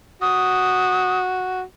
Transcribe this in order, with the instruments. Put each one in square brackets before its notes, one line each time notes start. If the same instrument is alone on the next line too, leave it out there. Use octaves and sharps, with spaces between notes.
[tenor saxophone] F#4 [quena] D#6